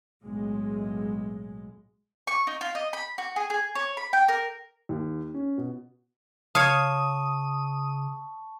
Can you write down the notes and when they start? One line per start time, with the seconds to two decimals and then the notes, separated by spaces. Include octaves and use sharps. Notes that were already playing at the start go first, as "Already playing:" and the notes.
0.24 B1 A2 G#3
2.27 C#6
2.47 D#4
2.61 F4
2.75 D#5
2.93 B5
3.18 F#4
3.36 G#4
3.50 G#4
3.75 C#5
3.97 B5
4.13 G5
4.28 A#4
4.89 D#2
5.34 C#4
5.58 B2
6.55 C#3 C#5 F5 A5 C#6 D#6